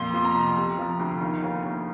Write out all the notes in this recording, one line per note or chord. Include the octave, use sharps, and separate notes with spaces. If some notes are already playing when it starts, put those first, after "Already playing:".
Already playing: F2 A#2 C6
F3
A#5
C2
C3
F3
D2
D#3
D#2
D#2